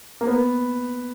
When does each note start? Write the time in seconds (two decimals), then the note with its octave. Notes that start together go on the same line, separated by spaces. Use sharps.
0.21 A#3
0.27 B3